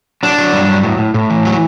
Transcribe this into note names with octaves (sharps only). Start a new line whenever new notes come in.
F#3 D4
F#3
G2
F#3
A2
A2
A2
E3
F#3